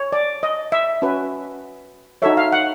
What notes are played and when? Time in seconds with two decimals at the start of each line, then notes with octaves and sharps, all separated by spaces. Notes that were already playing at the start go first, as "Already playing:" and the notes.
Already playing: C#5
0.12 D5
0.43 D#5
0.72 E5
1.02 C#4 F#4 B4
2.22 D#4 F#4 A4 C#5 E5
2.37 F5
2.52 F#5